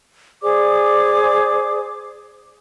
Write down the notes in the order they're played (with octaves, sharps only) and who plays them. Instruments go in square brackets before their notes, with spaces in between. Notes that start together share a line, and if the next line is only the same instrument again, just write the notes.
[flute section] G#4 C5 D5 D6